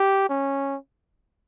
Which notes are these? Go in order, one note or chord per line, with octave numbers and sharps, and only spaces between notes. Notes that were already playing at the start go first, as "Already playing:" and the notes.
Already playing: G4
C#4